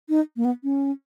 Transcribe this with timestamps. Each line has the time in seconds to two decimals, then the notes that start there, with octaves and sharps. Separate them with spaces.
0.09 D#4
0.37 A#3
0.45 B3
0.64 C#4